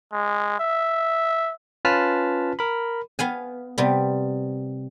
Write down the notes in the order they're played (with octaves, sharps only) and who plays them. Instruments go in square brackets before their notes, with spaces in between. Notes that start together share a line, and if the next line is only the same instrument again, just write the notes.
[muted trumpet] G#3
E5
[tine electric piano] C#4 F4 B4 A5 F6 B6
A#4 B5
[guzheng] B3 F5 G#5
C3 G3 B3